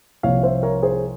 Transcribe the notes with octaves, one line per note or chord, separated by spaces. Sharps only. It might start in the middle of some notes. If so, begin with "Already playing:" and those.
C2 C3 F3 A#3 C#5 F5
C5 E5
A#4 C#5
G#4 C5